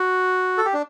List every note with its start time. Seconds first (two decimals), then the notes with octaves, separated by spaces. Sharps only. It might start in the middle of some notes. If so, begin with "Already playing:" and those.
Already playing: F#4
0.58 A4
0.65 G4
0.74 D4